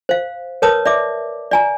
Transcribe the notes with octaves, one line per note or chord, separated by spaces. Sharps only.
C5 F5
A#4 B4 C#5 A5 D#6
D5 E5 D6
D5 G#5 A#5